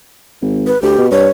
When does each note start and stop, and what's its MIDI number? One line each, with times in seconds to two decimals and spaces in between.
0.42 0.72 32
0.67 0.80 71
0.82 0.94 38
0.82 1.06 67
0.98 1.09 47
1.12 1.28 43
1.12 1.29 73